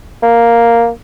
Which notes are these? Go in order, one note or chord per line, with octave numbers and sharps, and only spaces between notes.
A#3